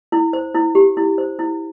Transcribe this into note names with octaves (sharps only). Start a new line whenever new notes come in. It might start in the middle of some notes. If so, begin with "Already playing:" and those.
E4
C5
E4
G4
E4
C5
E4